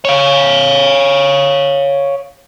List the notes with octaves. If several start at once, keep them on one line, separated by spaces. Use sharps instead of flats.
C#5 F5